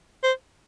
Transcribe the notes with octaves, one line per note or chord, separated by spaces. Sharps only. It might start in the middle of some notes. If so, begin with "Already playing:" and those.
C5